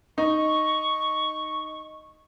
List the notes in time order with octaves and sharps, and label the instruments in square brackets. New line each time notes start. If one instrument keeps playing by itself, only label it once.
[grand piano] D#4 [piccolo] C#6